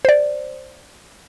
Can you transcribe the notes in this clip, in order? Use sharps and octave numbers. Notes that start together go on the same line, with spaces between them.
C5 D5